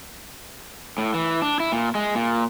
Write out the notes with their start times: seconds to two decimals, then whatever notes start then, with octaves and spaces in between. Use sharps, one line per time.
0.98 A2
1.14 E3
1.42 D4
1.60 E4
1.72 A#2
1.95 G#3
2.15 A#2